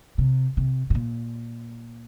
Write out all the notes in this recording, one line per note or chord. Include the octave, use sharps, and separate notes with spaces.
C3
C3
A2
A#2